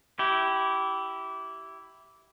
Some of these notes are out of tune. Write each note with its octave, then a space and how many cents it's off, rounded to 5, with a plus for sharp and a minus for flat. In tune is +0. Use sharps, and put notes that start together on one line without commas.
E4 +0 G4 -20